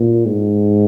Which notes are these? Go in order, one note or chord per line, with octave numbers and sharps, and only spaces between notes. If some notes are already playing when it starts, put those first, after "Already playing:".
Already playing: A#2
G#2